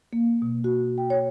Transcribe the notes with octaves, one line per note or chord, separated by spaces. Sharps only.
A#3
B2
F#4
G5
C#5